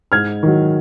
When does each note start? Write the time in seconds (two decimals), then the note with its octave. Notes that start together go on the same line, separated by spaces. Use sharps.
0.12 G#2 F6 G#6
0.43 D#3 F#3